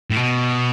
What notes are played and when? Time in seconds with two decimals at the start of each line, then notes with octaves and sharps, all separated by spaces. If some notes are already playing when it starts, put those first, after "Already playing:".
0.10 A2
0.17 B2